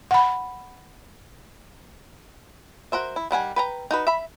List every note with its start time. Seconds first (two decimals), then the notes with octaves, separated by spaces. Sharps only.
0.11 F#5 B5
2.92 F#4 A#4 C5 E5
3.16 E4
3.31 D#3 G3 F#5 G#5
3.56 B4 G5 A#5
3.91 D#4 F#4 B4
4.07 E5 B5